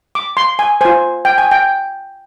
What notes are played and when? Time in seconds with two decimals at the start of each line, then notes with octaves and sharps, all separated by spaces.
0.15 D6
0.37 C6
0.59 G#5
0.81 F4 C5 G#5
1.25 G5
1.38 G#5
1.51 G5